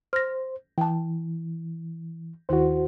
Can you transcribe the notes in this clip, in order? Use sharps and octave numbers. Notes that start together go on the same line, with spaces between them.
C5 F6 A#6
E3 G5 A5
D#2 D#3 E4 F#4 C5